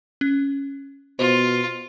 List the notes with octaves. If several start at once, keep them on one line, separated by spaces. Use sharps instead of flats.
C#4
B2 F4 C5